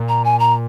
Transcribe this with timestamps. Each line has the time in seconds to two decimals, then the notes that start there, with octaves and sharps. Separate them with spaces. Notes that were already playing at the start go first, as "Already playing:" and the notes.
Already playing: A#2
0.09 A#5
0.25 G#5
0.40 A#5